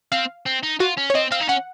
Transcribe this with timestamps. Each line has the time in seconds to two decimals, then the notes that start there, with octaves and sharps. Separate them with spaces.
0.12 C4 F5
0.46 C4
0.63 D#4
0.80 F4 F#4
0.98 C#4
1.10 C#5
1.15 C4 D#5
1.32 C4 F5
1.41 D#4
1.49 C#4 F#5